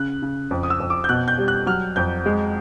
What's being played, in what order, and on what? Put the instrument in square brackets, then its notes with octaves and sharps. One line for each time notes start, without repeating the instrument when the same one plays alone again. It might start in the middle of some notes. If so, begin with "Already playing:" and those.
Already playing: [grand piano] C#3 F#6
C#3
F2
D#6
E6
F2
D6
G6
B2 F#6
G6
G3
F#6
F#3 F6
F2 G6
G#3